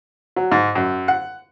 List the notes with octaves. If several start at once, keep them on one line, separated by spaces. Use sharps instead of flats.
F#3
G#2
F#2
F#5